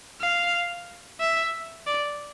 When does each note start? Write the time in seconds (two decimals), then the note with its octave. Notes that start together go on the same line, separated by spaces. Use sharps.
0.21 F5
1.20 E5
1.87 D5